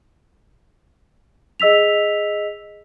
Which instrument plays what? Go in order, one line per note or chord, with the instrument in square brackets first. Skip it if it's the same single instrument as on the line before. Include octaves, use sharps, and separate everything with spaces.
[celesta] G#4 D#5 E6 B6 F7